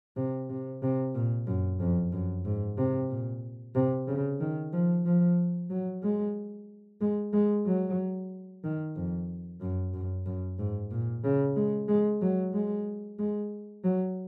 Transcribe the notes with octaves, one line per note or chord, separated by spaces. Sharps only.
C3
C3
C3
A#2
F#2
F2
F#2
G#2
C3
A#2
C3
C#3
D#3
F3
F3
F#3
G#3
G#3
G#3
F#3
D#3
F2
F#2
F#2
F#2
G#2
A#2
C#3
G#3
G#3
F#3
G#3
G#3
F#3